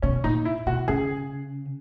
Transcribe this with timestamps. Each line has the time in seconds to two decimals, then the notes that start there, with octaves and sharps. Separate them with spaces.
0.02 B2 C#4
0.24 A#2 D#4
0.45 E4
0.67 B2 F#4
0.88 C#3 G#4